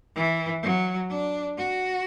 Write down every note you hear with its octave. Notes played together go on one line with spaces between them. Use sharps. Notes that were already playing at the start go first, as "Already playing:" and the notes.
E3
F#3
D4
F#4